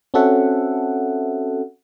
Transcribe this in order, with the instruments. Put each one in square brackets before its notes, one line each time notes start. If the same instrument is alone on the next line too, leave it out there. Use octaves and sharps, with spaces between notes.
[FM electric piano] C4 C#4 F#4 A4 E5 F#5